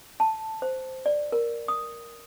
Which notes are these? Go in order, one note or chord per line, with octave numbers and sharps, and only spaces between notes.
A5
C5
D5
A#4
D#6